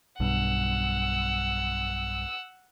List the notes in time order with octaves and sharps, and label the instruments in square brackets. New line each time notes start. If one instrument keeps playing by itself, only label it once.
[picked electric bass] B1 G2 [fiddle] F#5 E6